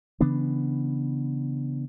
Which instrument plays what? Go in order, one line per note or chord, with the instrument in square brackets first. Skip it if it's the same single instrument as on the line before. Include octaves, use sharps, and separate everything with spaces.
[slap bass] C#3 E3 B3 D4